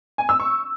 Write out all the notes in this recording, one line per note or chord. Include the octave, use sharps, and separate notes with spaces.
G#5
E6
C#6